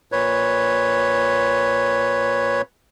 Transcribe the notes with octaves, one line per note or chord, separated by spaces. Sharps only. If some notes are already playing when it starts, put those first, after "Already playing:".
A#2 B4 C#5